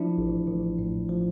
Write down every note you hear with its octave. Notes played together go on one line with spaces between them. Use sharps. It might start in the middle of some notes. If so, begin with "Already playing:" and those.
Already playing: F3 D4 E4
A1
A1
A2
F3